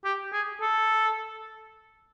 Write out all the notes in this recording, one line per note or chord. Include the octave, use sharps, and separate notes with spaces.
G4
G#4
A4